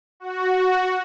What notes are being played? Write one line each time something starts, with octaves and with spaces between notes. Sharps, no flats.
F#4